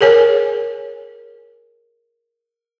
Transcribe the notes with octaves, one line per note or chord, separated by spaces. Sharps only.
G#4 A#4 C#5 G#5